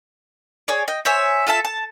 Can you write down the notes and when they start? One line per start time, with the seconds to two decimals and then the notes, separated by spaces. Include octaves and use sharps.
0.68 G#4 C#5 D5
0.88 D#5 G5
1.05 C5 C#5 E5 G#5
1.47 F4 A4 E5 A5
1.65 A5